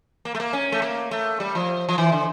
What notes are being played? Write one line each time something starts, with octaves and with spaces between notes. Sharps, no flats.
A#3
A3
A#3
C#4
A3
A#3
A3
G3
F3
F3
E3
D3